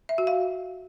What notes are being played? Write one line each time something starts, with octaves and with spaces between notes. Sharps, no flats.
E5
F#4
F5